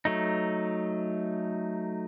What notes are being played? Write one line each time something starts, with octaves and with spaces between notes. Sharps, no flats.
F#3 A3 D#4